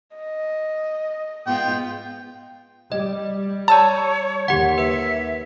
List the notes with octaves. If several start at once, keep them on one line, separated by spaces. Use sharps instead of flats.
D#5
G#2 B3 F4 G5
G3 D#5
C#5 D5 A5 E6 A6
D#2 G4 F#5
B4 E5